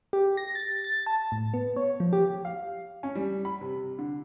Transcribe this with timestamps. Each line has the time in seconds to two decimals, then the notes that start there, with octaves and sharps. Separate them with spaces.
0.13 G4
0.37 A#6
0.55 A6
0.84 A6
1.07 A5
1.32 A2
1.54 B3
1.76 C#5
2.00 F3
2.13 G4
2.45 F5
3.03 C#4
3.15 G3
3.45 B5
3.61 C3
3.99 D3